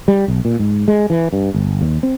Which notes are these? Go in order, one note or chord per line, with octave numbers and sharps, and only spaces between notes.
G3
B1
A#2
G#2
G#3
E3
G2
G1
D#2
C4